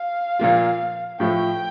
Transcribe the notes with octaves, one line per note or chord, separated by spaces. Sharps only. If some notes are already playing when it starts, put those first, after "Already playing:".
Already playing: F5
A#2 F3 A#3 F4
A2 F3 A3 G5